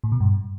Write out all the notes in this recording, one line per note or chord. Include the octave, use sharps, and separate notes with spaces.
A2
B2
G2